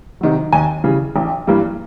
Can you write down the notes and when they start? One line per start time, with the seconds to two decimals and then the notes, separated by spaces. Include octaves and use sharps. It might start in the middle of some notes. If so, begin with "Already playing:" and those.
0.21 C3 D#3 F#3
0.52 D#2 G#5
0.84 C#3 E3 G3
1.16 A1
1.47 G2 E3 G3 A#3